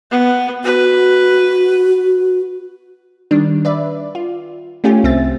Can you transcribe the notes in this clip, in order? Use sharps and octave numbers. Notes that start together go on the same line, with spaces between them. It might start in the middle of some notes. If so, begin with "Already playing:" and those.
B3
F#4 B4
D#3 G3 D4
B4 D5 E5
F4
A3 C#4 F4 G4 G#5
C2 C4 E5 A6